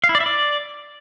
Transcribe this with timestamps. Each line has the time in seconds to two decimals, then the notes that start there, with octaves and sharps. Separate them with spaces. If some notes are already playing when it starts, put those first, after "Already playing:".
0.04 F5
0.09 E4
0.15 D5
0.20 E5
0.26 D5